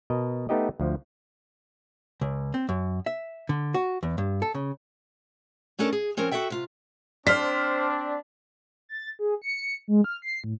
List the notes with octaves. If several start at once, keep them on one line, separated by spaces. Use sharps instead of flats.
B2 A#4 D#5
A3 B3 D#4 G4 D#5
D2 F3
C#2
C4
F#2
E5
D3
F#4
E2
G2
A4
C#3
A3 C#4 D4 A4 A#4
G#4
F3 C4 C#4 A#4
F#4 A4 D5 E5 G5
C3 F4
C4 D4 C5 D5 F6 B6
A6
G#4
C#7
G#3
F6
C7
A2